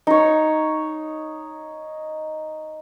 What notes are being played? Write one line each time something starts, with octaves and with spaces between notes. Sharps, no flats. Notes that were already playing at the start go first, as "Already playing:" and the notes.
D#4 C#5